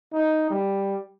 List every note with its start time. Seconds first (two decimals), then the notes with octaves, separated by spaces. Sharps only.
0.13 D#4
0.50 G3